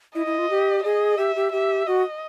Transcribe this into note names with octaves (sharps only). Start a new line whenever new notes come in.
E4 D#5
E4
F4
G4
G#4 D#5
G4 E5
G4
G4 E5
F#4 D#5